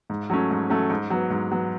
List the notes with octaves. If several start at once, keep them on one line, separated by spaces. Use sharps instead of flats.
G#2
F#3 A3 C#4
G#2
F#3 A3 C#4
G#2
F#3 B3
G#2
F#3 B3